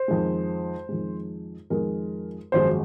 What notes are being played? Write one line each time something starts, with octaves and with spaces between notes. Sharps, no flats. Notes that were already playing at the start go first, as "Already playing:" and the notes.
Already playing: C5
F2 D#3 G#3
F2 D#3 G#3
F2 D#3 G#3 A#4
G#1 F#2 F3 G#3 C5